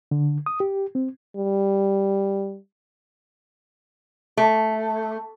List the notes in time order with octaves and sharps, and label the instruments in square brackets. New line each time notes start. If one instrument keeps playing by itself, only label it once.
[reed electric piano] D3
D#6
G4
C4
[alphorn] G3
[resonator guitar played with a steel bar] A3